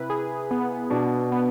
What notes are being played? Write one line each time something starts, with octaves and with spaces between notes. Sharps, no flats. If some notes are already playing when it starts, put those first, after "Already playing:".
Already playing: C3 E4 B4
G#4
B3
B2 D4
B3